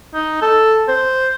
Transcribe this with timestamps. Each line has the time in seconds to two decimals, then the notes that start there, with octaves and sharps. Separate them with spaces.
0.14 D#4
0.42 A4
0.88 C5